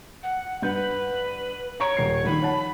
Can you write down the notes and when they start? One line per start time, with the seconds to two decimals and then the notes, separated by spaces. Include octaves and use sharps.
0.22 F#5
0.62 G2 B4 F#5 G6
1.80 C#5 A#5 C#6 D7
1.97 D#1 C7
2.25 A#1 D#3 B5
2.42 C#5 F#5 A5